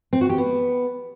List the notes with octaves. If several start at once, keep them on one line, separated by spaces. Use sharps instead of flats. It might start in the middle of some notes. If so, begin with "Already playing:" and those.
C4
F#4
G4
B3